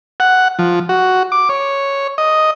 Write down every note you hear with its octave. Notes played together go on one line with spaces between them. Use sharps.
F#5
F3
F#4
D6
C#5
D#5